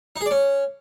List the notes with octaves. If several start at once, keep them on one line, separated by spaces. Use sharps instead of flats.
D#4
G#4
D5
C#4